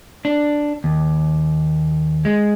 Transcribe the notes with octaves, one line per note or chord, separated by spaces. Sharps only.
D4
D#2
G#3